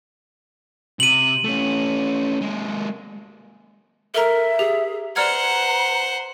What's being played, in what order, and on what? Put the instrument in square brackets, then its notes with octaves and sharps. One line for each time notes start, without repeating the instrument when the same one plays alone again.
[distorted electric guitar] C3 [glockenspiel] D#7 F#7
[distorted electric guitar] A3 C#4
G#3 A#3
[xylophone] A4 A#5 [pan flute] A#4 [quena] E5
[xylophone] G4 [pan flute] G#4
[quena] B4 [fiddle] C5 F#5 [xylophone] D5 F6 G#6 [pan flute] A#5